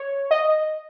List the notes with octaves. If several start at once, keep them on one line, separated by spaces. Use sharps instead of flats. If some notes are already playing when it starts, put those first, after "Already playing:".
Already playing: C#5
D#5